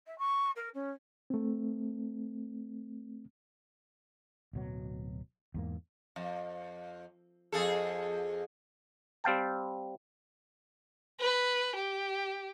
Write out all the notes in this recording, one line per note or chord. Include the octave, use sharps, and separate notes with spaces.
E5
C#6
A#4
C#4
A3 C4
D1 B2 F#3
E2 G#2 A#3
F2
F2 G#4 A4
G3 C4 F5 G5 A5
B4
G4